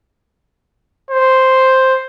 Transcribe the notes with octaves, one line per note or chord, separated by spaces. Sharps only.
C5